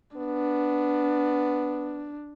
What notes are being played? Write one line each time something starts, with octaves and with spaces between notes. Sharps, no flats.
B3 D4